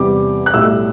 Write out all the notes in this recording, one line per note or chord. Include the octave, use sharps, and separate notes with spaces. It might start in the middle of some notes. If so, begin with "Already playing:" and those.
Already playing: E2 C3 G3 D6
F#6
B1 A2 G3 E6